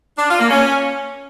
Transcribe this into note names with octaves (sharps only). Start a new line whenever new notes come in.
D4
F4
A#3
C#4